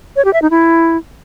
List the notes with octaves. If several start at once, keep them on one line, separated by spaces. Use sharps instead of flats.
C#5
G4
E5
D#4
E4